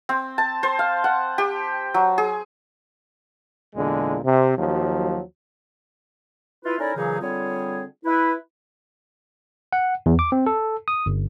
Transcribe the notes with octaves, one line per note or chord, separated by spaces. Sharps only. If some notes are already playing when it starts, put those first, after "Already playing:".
C4
A5
C5
F5
F#5
G4
F#3
G#4
E2 A#2 D3 G#3
C3
D#2 F3 F#3
E4 F4 B4
C#4 D#4 E4 A4 A#4 D5
A#2 C#3 E3 F#3 D#4 G#4
D3 G3 C4 F4 G#4 C#5
E4 B4
F#5
E2
D6
C4
A4
D#6
G1